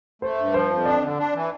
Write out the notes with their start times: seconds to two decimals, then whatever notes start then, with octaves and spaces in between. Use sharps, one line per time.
0.22 A3 C5
0.38 G2
0.53 F3 C5
0.71 F2
0.86 D4 D5
1.02 D3
1.18 D4
1.35 E3